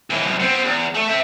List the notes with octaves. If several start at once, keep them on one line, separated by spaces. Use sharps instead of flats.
D#2 E3
C2 F#2
B3 C4
E2
A3
G4 E5